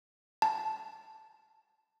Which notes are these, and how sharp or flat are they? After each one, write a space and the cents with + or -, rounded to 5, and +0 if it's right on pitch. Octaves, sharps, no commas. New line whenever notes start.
A5 -10